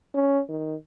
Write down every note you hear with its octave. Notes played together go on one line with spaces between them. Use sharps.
C#4
D#3